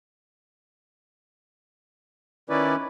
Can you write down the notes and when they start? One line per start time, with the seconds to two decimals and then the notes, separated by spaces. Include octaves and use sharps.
2.50 D#3 C#4 E4 B4 D5